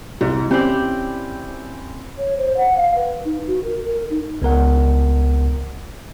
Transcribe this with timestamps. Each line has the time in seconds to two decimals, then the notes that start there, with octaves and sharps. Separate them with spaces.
0.21 C2 G#2
0.51 C4 C#4 E4 G4 C5 D5
2.18 C#5
2.37 C5
2.57 F#5
2.77 F5
2.95 B4
3.25 D#4
3.47 F#4
3.63 A#4
3.85 A#4
4.10 D#4
4.42 C#2 B3 A#4 F#5